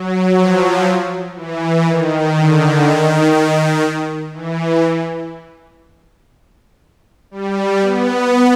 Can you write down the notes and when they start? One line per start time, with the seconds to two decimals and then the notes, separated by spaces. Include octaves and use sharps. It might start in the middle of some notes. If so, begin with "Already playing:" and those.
Already playing: F#3
0.36 F3
1.36 E3
1.85 D#3
2.35 D3
2.84 D#3
4.33 E3
7.31 G3
7.81 B3